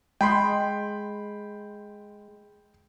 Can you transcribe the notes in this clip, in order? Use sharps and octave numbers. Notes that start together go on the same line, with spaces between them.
G#3 G5 B5 C6